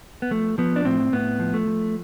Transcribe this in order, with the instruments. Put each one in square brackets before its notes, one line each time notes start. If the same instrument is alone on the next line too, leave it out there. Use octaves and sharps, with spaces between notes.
[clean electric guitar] B3
F3 A3
F3 B3
D4
A2 C4
A2 B3
F3
A3
F3